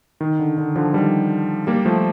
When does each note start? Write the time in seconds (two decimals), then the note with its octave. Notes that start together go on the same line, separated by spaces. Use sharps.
0.21 D#3
0.39 D3
0.58 D3
0.75 D3 F3
0.93 D#3 G3
1.67 G3 A#3
1.85 F3 A3